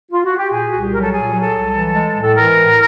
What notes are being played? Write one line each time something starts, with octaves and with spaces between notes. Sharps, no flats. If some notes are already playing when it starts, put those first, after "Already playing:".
F4
F#4
G4
A#2 G#4
C2 F#4
G4
F#3 A#4
A4
A#2 G#4
F#3
A4
C2
E3
G#3
A2
A4
E3 A#4
A2